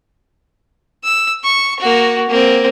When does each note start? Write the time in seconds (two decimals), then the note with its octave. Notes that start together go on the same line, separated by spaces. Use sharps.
1.04 E6
1.44 C#6
1.80 A#3 F#4
2.29 A#3 C4